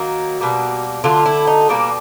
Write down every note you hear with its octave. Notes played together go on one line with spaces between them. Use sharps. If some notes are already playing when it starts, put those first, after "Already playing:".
Already playing: D#3 F#3 A#3 F#4
B2 G3 A#3
D3 F#3 A3 F4
E4
D#4
B2 G3 A#3 D4